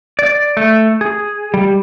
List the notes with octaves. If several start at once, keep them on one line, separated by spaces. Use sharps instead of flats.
D5
A3
G#4
G3